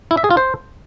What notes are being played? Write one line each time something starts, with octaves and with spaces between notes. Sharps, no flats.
E4
E5
G#4
F4
C5